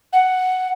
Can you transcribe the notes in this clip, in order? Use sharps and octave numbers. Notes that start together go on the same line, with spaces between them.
F#5